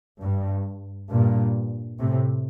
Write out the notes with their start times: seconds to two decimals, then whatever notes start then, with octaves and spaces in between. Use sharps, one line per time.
0.21 G2
1.10 G2 A#2
1.99 A2 C3